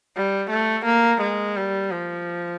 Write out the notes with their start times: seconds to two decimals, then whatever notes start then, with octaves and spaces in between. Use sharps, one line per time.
0.16 G3
0.51 A3
0.86 A#3
1.22 G#3
1.56 G3
1.91 F3